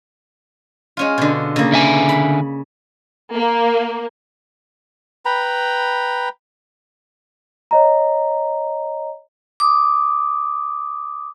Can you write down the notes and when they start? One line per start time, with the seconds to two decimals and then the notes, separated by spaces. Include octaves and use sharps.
0.97 G#3 C#4 F4
1.18 B2 D3
1.56 C#3 A#3
1.72 D3 E5 G#5
2.09 B5
3.34 A#3
5.25 B4 G5 A#5 B5
7.71 C#5 D#5 A#5
9.60 D6 D#6